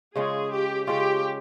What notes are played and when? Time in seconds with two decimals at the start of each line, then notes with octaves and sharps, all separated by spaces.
0.15 C#3 G#3 C#4 F4 G#4
0.51 G4
0.87 C#3 G#3 C#4 F4 G4